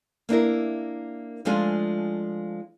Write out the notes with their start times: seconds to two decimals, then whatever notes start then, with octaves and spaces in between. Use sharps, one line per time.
0.29 A#3 D4 E4 A#4
1.45 F3 G#3 A3 D4 F4 G#4